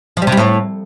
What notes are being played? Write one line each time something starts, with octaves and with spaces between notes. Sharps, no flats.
F3
G3
C3
G3
A2